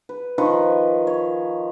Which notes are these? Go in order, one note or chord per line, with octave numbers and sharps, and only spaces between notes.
B4
D#3 F3 B4 C#6
C#5